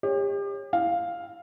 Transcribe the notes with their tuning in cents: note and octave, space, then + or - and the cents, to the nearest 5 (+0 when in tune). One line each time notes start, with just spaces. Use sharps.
G4 +35 C#5 -20
E4 +5 F5 +5